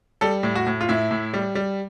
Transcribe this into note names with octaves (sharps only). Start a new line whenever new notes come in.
G3 A4
A2
F#4
A2
F4
A2 E4
A2
G3
G3